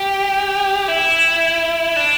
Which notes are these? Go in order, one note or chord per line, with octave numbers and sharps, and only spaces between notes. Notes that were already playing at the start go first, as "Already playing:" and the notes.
Already playing: G4
E4
D4